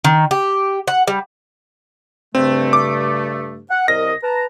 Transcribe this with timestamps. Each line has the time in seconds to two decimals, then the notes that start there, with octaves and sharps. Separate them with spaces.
0.04 D#3
0.31 G4
0.88 F#5
1.08 G3
2.35 G2 C#3 A3 C4
2.73 D6
3.70 F#5
3.88 C2 A#4 D#5 A#6
4.23 B4 A5 A#5